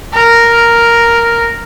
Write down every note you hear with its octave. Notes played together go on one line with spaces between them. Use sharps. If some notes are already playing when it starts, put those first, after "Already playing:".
A#4